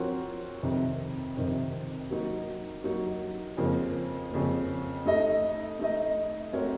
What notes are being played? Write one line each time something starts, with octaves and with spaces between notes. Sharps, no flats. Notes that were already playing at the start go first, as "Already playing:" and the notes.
Already playing: F3 C4 F#4 A#4 C#5
F2 C3 D#3
F2 C3 D#3
F#3 A#3 D#4
F#3 A#3 D#4
F2 C#3 F3 A#3
F2 C#3 F3 A#3
A3 D#4 A4 D#5
A3 D#4 A4 D#5
A3 C4 F#4 A#4 C#5